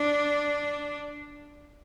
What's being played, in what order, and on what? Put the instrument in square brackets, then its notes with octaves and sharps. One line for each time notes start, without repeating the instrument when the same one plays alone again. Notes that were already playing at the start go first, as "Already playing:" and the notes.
Already playing: [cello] D4